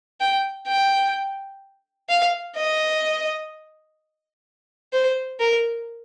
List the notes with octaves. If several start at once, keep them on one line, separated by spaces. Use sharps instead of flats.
G5
G5
F5
D#5
C5
A#4